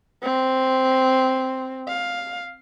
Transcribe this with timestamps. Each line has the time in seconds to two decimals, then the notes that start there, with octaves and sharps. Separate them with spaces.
0.23 C4
1.88 F5